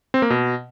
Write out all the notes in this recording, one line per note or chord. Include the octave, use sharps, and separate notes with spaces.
C4
A#3
B2